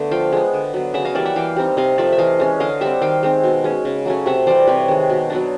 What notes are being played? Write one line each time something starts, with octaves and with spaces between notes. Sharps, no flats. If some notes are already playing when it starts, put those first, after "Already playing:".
Already playing: D3 A3 B3
F3 F5 G5
G#3 B3
D3
F#3 B3
C#3 E5 F#5
D#5 F5
E3 G3 A#3 D5 E5
E5 F#5
E3 F5 G5
G3 C4 D#4
C3 D#5 F5
F3 A3 D5 E5
E5
E3 D#5 F5
G#3 C#4
D3 D#5 F5
G3 C4 E5 F#5
D#3 F5 G5
G#3 C4 D#4
B2
G#3 C#4
C#3
F#3 A3 C#4
C3 E5 F#5
E3 G3 C5 D5
C3 B4 C#5
D#3 G#3
B2
F#3 B3 D4